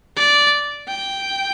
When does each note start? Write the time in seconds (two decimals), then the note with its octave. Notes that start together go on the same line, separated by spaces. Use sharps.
0.17 D5
0.88 G5